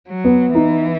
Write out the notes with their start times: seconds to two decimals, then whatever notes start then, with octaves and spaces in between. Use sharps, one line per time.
0.09 F#3
0.25 B3
0.55 E3 D#4